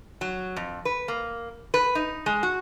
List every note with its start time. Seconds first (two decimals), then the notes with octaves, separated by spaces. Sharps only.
0.21 F#3
0.56 F2
0.85 B4
1.08 A#3
1.74 B4
1.95 D#4
2.26 G#3
2.43 F#4